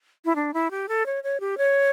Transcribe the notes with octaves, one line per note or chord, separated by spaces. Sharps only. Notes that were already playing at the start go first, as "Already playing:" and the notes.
E4
D4
E4
G4
A4
C#5
C#5
G4
C#5